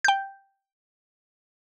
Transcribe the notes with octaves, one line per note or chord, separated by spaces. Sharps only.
G5 G6